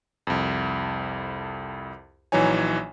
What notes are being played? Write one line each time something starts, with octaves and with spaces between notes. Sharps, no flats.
C2 F2
A#1 E3 F#3 D#4 C#5 G#5